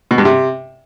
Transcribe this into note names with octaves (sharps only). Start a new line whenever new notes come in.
B2
G2
C3